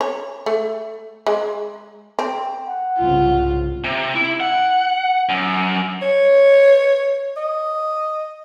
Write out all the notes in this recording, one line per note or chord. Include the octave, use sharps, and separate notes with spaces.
C#5
A3
G#3
C4
F#5
C2 G#2 C#3 F4
C3
E4
F#5
F#2
C#5
D#5